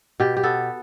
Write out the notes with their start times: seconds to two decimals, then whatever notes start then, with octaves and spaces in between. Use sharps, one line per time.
0.20 B2 G4
0.37 G4
0.43 B3 A4